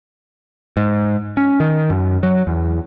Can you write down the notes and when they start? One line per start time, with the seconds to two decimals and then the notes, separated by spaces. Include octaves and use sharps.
0.77 G#2
1.37 C#4
1.60 D#3
1.90 F#2
2.23 F#3
2.47 E2